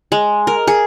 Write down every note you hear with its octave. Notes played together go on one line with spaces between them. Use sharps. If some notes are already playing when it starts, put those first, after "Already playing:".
G#3
A#4
G#4